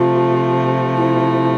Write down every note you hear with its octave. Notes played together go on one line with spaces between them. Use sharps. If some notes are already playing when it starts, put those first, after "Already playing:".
Already playing: C3 F3 A3 F4
E4